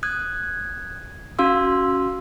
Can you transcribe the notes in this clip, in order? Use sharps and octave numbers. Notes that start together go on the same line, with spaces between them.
D#6 F#6 G#6
C#4 F#4 F5 C6 E6